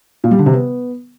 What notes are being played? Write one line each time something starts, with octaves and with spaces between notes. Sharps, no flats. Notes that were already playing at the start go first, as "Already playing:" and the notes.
A#2
G3
D3
C3
B3